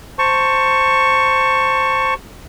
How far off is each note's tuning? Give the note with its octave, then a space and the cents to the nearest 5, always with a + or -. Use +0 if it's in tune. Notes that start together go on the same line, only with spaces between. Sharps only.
C5 +0 A5 +25 C#6 +0